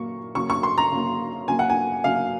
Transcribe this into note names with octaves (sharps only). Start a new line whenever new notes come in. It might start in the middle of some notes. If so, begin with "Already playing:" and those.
Already playing: A#2 F#3 A#3 C#6
C#3 F#3 A#3 C#6
C#6
C6
A#5
C#3 F#3 A#3
C#3 F#3 A#3 G#5
F#5
G#5
C#3 F#3 A#3 F5